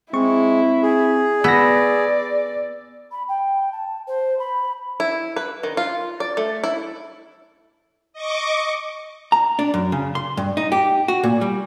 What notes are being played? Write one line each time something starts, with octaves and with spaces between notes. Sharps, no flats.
G#3 C4 E4 C#6
G#4
B3 D5 E6 A#6
B5
G5
A5
C5
B5
E4
B4
D#3
F4
D5
A3
E4
D#5 C#6 D6
A#5
D4
F#2
C#3
C6
G2
D#4
G4
F#4
A#2
G3